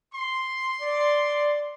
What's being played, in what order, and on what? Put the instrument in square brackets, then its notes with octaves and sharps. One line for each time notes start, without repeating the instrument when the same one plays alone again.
[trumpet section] C6
[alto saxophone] D5